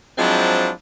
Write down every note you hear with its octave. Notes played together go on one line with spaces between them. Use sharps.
F3 F#3 G#3 C4 D4 E4